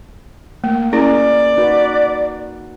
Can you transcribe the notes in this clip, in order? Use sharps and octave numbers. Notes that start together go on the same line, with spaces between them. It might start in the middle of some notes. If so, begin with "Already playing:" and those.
A3 A#3
C#4 E4 G#4 A#4 D5
D#4 F#4 B4